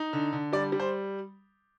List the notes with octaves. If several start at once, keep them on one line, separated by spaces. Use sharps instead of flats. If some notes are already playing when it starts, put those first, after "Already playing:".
Already playing: D#4
D3
D3
G3 D5
G3
C5